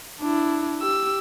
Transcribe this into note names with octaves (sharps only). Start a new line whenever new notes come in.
D4 E4
G4 E6